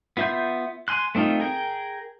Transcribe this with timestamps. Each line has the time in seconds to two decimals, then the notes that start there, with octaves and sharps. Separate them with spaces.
0.17 B3 F4 E5 C6 G6
0.88 G#5 C6 F#6
1.15 A3 C4 D#4 F4
1.40 G#4 A#4 G5